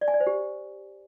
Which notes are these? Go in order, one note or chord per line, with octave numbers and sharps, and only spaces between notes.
D5
G#5
D5
C5
G4